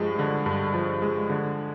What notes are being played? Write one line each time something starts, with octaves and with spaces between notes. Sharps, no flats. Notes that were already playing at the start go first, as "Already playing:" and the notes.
Already playing: G2 F3 G#3
D3
G2
F3
G#3
D3